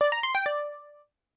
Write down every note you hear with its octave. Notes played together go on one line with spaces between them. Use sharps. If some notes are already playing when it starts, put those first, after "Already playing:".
D5
A#5
C6
G5
D5